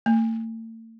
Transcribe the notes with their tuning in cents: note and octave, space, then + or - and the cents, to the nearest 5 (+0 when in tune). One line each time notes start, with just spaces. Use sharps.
A3 +45